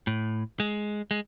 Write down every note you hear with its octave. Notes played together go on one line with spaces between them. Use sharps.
A2
G#3
G#3